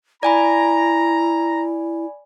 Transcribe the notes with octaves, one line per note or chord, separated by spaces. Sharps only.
E4 D5 G#5 A#5 B5